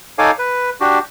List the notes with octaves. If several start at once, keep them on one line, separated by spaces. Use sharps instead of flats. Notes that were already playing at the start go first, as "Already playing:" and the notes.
D#4 A4 C#5 F5 G#5 D6
B4
D4 F#4 G4